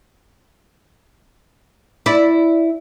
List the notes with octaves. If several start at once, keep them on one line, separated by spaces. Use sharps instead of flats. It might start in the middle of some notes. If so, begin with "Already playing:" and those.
E4 D5